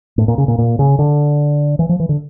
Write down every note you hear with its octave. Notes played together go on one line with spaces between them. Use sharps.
A2
A#2
C#3
A#2
A#2
C#3
D3
E3
F3
E3
D3